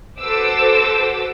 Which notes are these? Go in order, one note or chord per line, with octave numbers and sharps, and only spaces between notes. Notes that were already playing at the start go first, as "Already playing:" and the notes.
F#4 A4 B4 C5 D6 E6